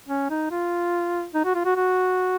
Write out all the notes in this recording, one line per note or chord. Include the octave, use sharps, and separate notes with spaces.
C#4
D#4
F4
D#4
F#4
F4
F#4
F#4